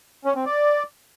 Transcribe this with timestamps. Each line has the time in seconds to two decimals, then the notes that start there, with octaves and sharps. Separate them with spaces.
0.25 C#4
0.35 C4
0.46 D5